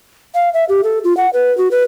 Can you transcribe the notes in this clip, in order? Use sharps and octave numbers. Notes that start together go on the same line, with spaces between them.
F5
E5
G4
A4
F4
F#5
B4
F#4
B4